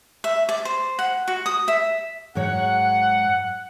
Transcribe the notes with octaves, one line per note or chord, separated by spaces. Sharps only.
E5
D5
C5
F#5
F#4
D#6
E5
G#2 F#3 C#5 F#5